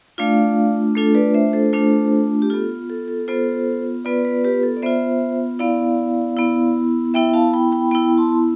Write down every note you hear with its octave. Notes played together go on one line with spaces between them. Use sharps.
A3 D4 F4 D5 F5
A3 D4 F4 A4
B4 D5
C5 E5
A4 C5
A3 D4 F4
G4
B3 F4 A4
A4
A4
B3 F4 A4 C5
B3 F4 B4 D5
B4 D5
G4 B4
A4
D5
B3 F4 C5 E5
B3 E4 D5 F5
B3 E4
B3 E4 E5 G5
F5 A5
G5 B5
G5 B5
B3 E4 G5 B5
A5 C6